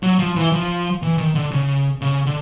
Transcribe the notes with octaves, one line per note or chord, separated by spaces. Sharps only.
F#3
F3
E3
F3
E3
D#3
D3
C#3
C#3
D3